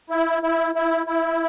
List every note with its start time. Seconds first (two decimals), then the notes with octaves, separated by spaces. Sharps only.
0.10 E4
0.43 E4
0.75 E4
1.07 E4